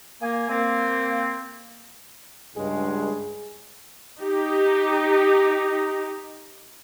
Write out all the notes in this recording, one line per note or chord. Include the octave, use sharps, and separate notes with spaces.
A#3 G#5
A#3 C4
C#2 G2 G#3 G#4
D#4 G4